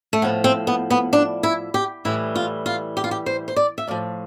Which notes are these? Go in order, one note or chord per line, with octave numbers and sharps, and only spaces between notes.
A3
A2 F3 B3
C4
B3
B3
D4
E4
G4
A2 E3 G3 E4
F4
F4
G4
F4
G4
C5
C5
D5
E5
A2 F3 D5